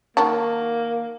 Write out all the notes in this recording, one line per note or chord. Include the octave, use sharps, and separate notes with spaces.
D#3 F#3 A#3 A5